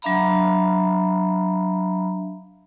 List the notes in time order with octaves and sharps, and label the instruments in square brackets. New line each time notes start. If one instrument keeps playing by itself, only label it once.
[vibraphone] F#3 D4 E5 F5 A#5 B5